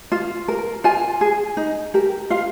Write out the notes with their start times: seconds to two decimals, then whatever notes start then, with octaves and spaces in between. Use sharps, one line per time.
0.12 F4
0.48 A#4
0.84 F4 G#5
1.21 G#4
1.57 D#4
1.94 G4 A#4
2.30 F4 F5